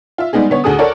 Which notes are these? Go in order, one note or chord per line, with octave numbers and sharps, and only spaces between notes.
F4 E5
G3 G#3 B3 D#4 G#4
D3 B3 C#5
D2 F#4 G#4 A4 D#6
A4 A#4 C#5 D5 F#5